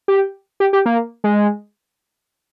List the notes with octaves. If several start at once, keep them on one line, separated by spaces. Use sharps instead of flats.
G4
G4
G4
A#3
G#3